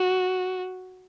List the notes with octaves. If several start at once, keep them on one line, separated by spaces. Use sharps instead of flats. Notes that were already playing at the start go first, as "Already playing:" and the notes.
Already playing: F#4